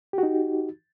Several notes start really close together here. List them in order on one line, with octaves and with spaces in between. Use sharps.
G4 F#4 D#4